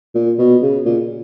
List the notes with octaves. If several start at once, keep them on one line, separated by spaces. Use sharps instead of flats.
A#2
B2
C#3
A#2